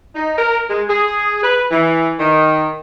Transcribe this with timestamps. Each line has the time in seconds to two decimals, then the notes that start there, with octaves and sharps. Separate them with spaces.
0.15 D#4
0.36 A#4
0.69 G#3
0.89 G#4
1.44 B4
1.71 E3
2.19 D#3